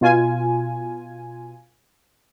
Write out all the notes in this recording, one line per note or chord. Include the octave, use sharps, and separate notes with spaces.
B2 F4 G#5